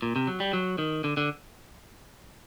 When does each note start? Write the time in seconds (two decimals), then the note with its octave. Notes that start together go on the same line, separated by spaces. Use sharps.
0.02 A#2
0.16 C3
0.27 F#3
0.40 G3
0.53 F#3
0.78 D#3
1.04 D3
1.17 D3